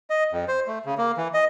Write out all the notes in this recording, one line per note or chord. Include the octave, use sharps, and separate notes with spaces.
D#5
F2
C5
A3
C#3
A#3
E3
D#5